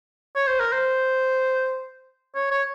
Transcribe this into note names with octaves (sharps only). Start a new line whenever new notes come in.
C#5
C5
A#4
C5
C#5
C#5